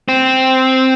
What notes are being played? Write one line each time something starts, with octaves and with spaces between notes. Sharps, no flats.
C4